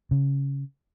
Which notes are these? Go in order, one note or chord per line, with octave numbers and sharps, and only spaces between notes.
C#3